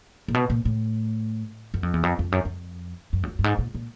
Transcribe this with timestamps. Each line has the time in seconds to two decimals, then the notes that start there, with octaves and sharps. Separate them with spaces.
0.28 A#2
0.34 B2
0.50 A#2
0.65 A2
1.74 F#2
1.83 F2
1.94 E2
2.03 F2
2.19 F2
2.32 F#2
2.45 F2
3.13 F#2
3.23 F2
3.27 F#2
3.39 G2
3.44 G#2
3.59 A#2
3.75 A#2